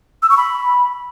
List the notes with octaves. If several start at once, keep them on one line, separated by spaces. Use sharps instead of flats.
E6
C#6
B5